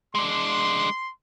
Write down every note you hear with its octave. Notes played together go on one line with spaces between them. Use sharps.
G#3 D4 C6